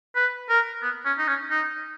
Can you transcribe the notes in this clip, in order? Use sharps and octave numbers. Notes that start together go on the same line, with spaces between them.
B4
A#4
B3
C#4
D#4
C#4
D#4